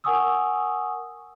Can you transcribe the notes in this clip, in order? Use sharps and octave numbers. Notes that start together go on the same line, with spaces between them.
A#4 F#5 G#5 C#6 D#6 E6